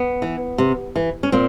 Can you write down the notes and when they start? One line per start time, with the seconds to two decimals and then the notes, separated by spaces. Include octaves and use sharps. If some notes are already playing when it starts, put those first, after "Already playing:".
Already playing: B3
0.22 E3
0.58 C3
0.96 E3
1.23 C#4
1.32 A#2 C4